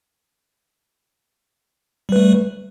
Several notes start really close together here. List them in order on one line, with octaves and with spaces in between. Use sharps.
G3 B4 A3